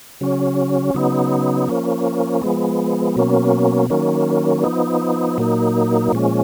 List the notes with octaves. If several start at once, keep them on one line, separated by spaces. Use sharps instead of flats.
C#3 F#3 C#4
C#3 F#3 B3 D#4
F3 A#3 C#4
F3 G#3 B3
B2 F#3 A#3 C#4
D#3 F#3 A#3 C#4
F3 B3 D#4
A#2 F#3 A#3 D#4
A#2 F3 G#3 C#4